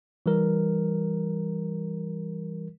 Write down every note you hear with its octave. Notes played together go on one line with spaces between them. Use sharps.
E3 G3 A#4